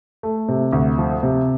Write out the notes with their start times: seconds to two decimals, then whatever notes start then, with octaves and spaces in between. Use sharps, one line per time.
0.23 A3
0.49 C3
0.73 D2
0.98 F3
1.23 C3